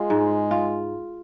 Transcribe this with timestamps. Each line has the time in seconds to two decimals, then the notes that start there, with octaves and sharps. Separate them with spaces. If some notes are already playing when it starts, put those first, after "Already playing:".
Already playing: G#3 F4
0.10 G#2
0.51 F4